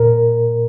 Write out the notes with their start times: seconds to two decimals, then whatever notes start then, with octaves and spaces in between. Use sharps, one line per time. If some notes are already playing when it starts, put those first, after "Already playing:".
Already playing: A#2 A#4